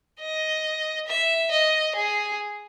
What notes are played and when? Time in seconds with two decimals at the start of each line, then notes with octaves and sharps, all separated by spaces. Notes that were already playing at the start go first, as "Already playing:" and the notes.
0.20 D#5
1.07 E5
1.51 D#5
1.95 G#4